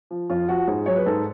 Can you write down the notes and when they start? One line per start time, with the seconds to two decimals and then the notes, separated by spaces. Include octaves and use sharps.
0.11 F3
0.30 F2 F4
0.48 F3 F#4
0.67 G#2 G#4
0.86 F#3 C#5
0.96 B4
1.06 G#2 A4